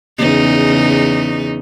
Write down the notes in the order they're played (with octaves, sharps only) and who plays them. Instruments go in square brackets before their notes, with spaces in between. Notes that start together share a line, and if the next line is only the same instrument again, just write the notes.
[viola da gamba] E2 C#3 D#4